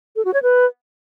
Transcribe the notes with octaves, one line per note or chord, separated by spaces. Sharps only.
A4
F#4
C#5
B4